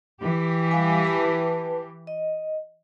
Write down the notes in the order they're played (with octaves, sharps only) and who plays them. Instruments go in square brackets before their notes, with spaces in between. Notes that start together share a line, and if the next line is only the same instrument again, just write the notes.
[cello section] E3 G4
[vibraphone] G3 F5 G#5
B4 A5
D#5